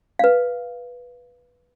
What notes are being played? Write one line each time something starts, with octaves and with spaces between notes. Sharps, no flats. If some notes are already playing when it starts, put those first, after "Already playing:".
B4 F5